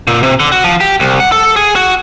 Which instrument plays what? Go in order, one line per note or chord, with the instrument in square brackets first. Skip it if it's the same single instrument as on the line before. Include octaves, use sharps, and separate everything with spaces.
[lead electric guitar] A#2
C3
D3
F#4
F3
G4
C2
F#5
A4
G#4
F#4